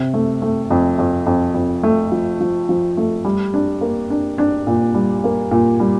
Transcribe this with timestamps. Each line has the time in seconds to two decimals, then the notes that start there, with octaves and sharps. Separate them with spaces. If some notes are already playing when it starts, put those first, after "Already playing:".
Already playing: C3
0.14 A3
0.42 A3
0.71 F2
0.98 F2
1.27 F2
1.54 F2
1.83 A3
2.12 F3
2.40 F3
2.69 F3
2.97 A3
3.25 G3
3.54 D4
3.81 A#3
4.10 D4
4.38 D4
4.67 A#2
4.95 G3
5.24 A#3
5.51 A#2
5.80 G3